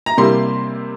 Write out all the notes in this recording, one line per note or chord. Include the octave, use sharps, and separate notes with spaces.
A#5
C3 G3 A#3 E4 C6